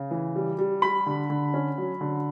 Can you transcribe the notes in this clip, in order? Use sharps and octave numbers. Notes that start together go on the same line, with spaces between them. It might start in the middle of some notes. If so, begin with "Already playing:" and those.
Already playing: C#3
E3
G3
G3
G3 B5
D3
D3
C#4
F#3
D3